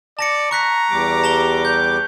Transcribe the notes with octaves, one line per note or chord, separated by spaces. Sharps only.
D5 A5 A#6 C#7
A#5 C#6 F#6 B6
E2 G3 D6
A5 F7 G7
G6